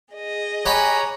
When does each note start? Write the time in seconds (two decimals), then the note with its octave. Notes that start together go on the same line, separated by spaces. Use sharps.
0.15 G#4 D#5
0.65 G4 C#5 F#5 G#5 A#5 B5